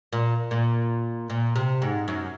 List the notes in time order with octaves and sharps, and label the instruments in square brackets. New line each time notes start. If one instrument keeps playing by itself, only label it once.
[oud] A#2
A#2
A#2
C3
G#2
F#2